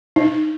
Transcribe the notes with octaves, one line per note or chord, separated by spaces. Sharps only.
D#4